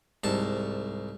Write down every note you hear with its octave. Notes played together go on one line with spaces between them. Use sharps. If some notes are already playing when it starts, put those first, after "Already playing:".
C2 G#2 A5